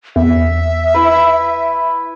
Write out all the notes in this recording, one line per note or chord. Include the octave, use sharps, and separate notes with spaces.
E2 E5
E4 B4